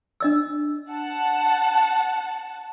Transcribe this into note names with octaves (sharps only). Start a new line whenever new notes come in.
D4 D#5 E6
F#5 A5